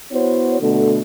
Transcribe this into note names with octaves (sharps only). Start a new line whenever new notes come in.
B3 E4 F#4 C5 C#5
B2 D3 A3